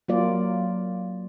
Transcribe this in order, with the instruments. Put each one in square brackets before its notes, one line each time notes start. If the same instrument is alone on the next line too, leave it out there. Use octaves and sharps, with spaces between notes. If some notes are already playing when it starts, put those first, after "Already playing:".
[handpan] F#3 A#3 F4 D5